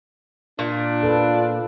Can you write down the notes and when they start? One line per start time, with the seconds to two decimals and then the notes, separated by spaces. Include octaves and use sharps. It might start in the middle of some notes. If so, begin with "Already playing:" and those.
0.59 A#2 D4
1.03 F4 A4 B4